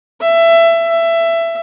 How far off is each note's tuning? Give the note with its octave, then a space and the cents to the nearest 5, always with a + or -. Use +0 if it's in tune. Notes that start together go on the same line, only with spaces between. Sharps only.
E5 +20
E5 +20